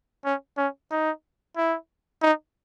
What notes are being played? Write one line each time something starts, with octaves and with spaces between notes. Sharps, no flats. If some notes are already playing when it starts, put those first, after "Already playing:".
C#4
C#4
D#4
E4
D#4